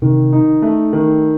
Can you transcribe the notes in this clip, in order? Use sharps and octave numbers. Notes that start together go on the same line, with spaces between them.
C3 D#3
D#4
A3
D#3